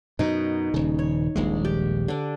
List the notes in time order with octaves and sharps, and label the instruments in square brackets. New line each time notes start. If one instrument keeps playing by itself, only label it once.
[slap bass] F#2 B2 [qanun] D#4
[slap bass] D#1 C#3
[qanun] C#5
[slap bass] D#1 A#1 G#3
[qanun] G4
D3 D4